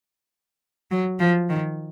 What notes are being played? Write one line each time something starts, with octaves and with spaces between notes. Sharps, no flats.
F#3
F3
D#3